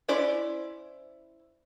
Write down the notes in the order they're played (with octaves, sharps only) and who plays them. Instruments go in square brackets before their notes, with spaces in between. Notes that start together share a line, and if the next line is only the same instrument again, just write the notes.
[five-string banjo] C#4 E4 C5 D5